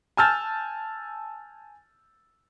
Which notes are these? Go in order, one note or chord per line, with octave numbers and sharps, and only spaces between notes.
G#5 A5 E6 F6 G6 A6